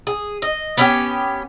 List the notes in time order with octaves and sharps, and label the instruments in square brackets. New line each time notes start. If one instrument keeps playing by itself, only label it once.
[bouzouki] G#4
D#5
B3 C#4 G4